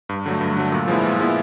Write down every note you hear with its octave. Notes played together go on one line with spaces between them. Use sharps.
G2
D3 F#3 A3
G2
D3 F#3 A3
A#2
F3 G#3 B3 E4
A#2
F3 G#3 B3 E4